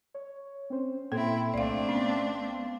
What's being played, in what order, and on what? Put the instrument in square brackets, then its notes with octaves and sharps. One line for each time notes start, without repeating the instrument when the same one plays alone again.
[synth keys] C#5
C4 C#4 C5
[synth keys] A#2 [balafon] A#3 A4 [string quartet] C4 E4
[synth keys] C2 [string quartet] A3 C4 D4 [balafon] D5 F5
[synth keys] B3 F5 [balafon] C#4